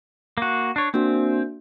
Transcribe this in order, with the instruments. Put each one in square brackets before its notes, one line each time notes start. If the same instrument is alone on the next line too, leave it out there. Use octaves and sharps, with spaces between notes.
[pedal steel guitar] A#3 F#4
D4 C#5
[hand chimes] A#3 D4 F#4 [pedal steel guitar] C4